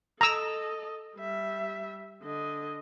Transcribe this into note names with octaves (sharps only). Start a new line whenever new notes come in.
A4 D#5 A#5 E6
G3 E5
D3 D#5